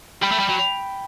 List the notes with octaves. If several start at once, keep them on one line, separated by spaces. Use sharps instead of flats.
G3 G5 B5
A3
G3
F#3